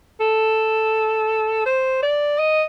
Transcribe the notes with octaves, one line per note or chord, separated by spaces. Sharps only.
A4
C5
D5
D#5